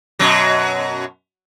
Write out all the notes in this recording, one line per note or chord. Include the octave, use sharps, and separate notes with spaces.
F#2 B2 F#3